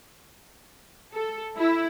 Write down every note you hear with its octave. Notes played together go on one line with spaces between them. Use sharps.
A4
E4